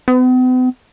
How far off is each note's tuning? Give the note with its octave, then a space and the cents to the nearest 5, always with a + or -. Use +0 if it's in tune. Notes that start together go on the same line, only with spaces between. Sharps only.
B3 +45